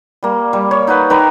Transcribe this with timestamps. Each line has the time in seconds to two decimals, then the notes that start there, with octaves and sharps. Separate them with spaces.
0.23 G3 A#3
0.53 G3
0.71 C#5
0.87 D#4 F#4 B4
1.10 D#3 B4 A#5 D6